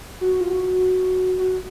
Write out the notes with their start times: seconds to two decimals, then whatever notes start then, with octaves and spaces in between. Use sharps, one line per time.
0.21 F#4
0.41 F4
0.50 F#4
1.38 F#4